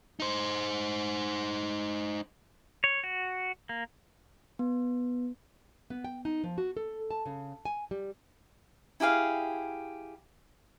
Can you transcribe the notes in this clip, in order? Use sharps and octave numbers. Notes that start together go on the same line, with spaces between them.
D#4 C5
C#5
F#4
A#3
B3
B3
G5
D#4
F3
F#4
A4
A5
C#3
G#5
G3
E4 G4 G#4 F5